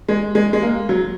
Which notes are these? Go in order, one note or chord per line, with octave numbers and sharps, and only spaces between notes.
G#3
G#3
G#3
A#3
F#3